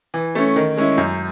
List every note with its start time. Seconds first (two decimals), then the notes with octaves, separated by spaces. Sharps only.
0.14 E3
0.35 A3 C#4
0.56 D#3
0.77 G#3 C#4 E4
0.98 F#2